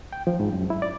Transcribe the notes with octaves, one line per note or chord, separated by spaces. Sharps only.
G5
F3
G#2
F#2
E4
D5